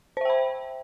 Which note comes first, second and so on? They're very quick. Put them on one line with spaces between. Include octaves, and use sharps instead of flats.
C5 E5 G5 B5